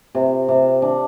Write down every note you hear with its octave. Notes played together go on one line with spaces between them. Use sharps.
C3
C3
D4